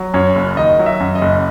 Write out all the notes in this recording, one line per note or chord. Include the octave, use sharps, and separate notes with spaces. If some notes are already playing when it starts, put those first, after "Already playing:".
Already playing: F#3
F#2 C#5
F#1
D#3 D#5
F#3
E5
F#2
D#5
F#1